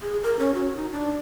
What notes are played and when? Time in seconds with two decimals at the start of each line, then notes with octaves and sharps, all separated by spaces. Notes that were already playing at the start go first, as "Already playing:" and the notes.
0.01 G#4
0.23 A#4
0.39 C#4
0.54 F#4
0.77 D#4
0.93 D4